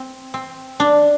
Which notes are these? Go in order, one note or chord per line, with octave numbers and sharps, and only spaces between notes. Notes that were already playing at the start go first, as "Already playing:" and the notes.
Already playing: C4
C4
D4